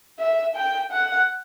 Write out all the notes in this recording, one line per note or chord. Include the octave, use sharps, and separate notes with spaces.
E5
G5
F#5